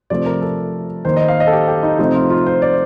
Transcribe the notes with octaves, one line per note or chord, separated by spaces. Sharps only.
C3 F3 A3 D5
A#4
A4
D#3 A#3 C5
D#5
F5
D#5
A4
G4
G4
D#4
C3 F3 A3 C4 D#4
F4
F4
C5
D5